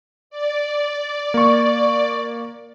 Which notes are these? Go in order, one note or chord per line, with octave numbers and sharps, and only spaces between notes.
D5
A#3 C#6